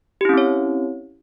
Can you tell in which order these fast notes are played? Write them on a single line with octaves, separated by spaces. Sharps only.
G4 E4 C#4 C4 C#5